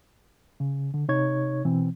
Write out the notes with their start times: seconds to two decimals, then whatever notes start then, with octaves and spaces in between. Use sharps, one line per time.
0.60 C#3
0.94 D3
1.08 C3 D#4 C#5 C#6 G#6
1.65 B2 E3 C4